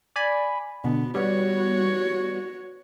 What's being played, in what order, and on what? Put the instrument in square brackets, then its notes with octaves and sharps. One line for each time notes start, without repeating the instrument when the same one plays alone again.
[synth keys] D5 G#5 B5
[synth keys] B2 D3 [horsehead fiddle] B3
[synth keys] G3 B3 [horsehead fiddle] F#4 C#5